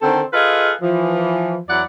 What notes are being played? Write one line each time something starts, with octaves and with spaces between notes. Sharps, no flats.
D3 D#3 C4 A4 C5
F4 G#4 A4 B4 D#5 F5
E3 F3
E2 F#3 E4 D5 F#5